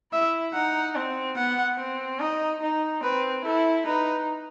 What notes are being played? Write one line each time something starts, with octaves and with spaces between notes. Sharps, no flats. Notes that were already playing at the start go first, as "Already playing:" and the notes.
E4 E5
D#4 F#5
C4
B3 F#5
C4
D#4 D#5
D#4
C4 B4
E4 A4
D#4 B4